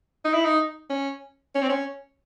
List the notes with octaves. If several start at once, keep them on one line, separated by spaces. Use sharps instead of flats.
D#4
E4
D#4
C#4
C#4
C4
C#4